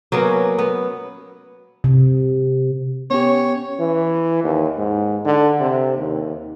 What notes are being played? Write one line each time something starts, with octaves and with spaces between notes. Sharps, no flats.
F#3 A#3 B3 C#4
B3
C3
B3 C#4 G4 C#5
E3
D#2
G#2
D3
C3
D#2